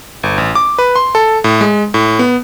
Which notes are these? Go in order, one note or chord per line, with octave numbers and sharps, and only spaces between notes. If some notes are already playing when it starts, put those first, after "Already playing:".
G1
A1
D6
B4
C6
A4
A2
G#3
A2
B3